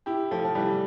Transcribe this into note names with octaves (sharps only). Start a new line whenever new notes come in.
E4 G4
F3 A3
F3
E3 G3